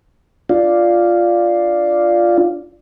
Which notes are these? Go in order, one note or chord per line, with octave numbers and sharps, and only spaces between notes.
D4 F4